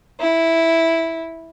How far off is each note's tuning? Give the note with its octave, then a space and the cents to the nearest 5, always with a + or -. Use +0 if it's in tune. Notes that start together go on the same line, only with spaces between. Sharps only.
E4 -5